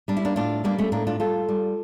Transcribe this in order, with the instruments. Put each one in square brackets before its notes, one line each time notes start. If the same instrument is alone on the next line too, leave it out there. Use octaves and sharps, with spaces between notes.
[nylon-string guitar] G3 D4
E4
A#3 D4
A2 D4 F4
G3 A#3 D4
A3 C#4
A2 A#3 D4
D4 F4
G3 F4 A4
G3